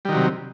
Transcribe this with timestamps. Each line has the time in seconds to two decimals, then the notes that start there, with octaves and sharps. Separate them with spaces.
0.05 G3
0.09 D#3
0.12 F#3
0.16 C3